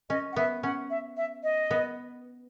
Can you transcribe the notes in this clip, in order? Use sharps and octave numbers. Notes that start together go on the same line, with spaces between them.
C#4 D#5
F#5
B3 E5
C#4 F#5
E5
E5
D#5
B3